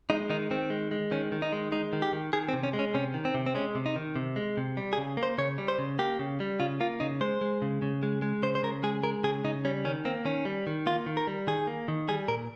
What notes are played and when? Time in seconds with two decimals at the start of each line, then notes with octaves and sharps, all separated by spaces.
0.10 G#3 D#4
0.30 D#3 D#4
0.51 D#3 C4
0.70 G#3
0.91 G#3
1.11 D#3 C#4
1.32 D#3
1.42 D#4
1.52 G#3
1.72 G#3 D#4
1.93 D#3
2.02 G4
2.13 D#3
2.33 D#3 G#4
2.49 C4
2.53 C3
2.63 C#4
2.73 G#3
2.79 C#4
2.94 C3 C#4
3.14 D#3
3.25 C4
3.35 C3
3.46 C4
3.55 G#3 C#4
3.75 C3
3.86 D#4
3.96 D#3
4.16 C3
4.36 G#3
4.57 C3
4.77 G3
4.93 G#4
4.98 C#3
5.17 A#3
5.23 C5
5.38 C#3 C#5
5.58 G3
5.68 C5
5.79 C#3
5.99 A#3 G4
6.19 C#3
6.40 G3
6.60 C#3 F4
6.80 A#3 F4
7.00 C#3 D#4
7.21 G#3 C5
7.41 G#3
7.62 C#3
7.82 C#3
8.03 G#3
8.22 G#3
8.43 C#3 C5
8.55 C5
8.63 C#3 A#4
8.83 G#3 G#4
9.03 G#3 A#4
9.24 C#3 G#4
9.45 C#3 D#4
9.65 G3 C#4
9.85 D#3 C#4
10.05 A#3 C4
10.25 D#3 C#4
10.45 G3
10.67 D#3
10.86 A#3 F4
11.06 D#3
11.17 A#4
11.27 G3
11.47 D#3 G#4
11.67 A#3
11.88 D#3
12.08 G3 G#4
12.28 A#2 A#4